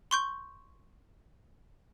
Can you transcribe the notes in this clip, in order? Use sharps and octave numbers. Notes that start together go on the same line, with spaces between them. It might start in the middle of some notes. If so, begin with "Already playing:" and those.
C6 C#6 G6